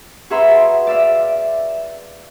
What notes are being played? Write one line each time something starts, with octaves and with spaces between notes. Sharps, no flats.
F#4 G#4 B4 E5 A#5 C6
D5 E5 F5